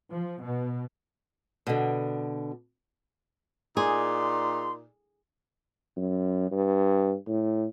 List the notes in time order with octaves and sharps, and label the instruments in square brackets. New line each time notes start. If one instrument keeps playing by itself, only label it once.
[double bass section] F3
B2
[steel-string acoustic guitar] B2 D3
[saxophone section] A#2 D#4 D5 [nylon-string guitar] G#4 [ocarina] C6
[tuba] F#2
G2
A2